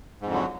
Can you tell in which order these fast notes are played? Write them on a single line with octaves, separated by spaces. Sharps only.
G#2 F2 D3 F#3